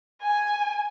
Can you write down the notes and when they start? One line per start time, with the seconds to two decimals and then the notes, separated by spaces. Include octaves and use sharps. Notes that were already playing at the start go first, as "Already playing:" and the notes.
0.22 G#5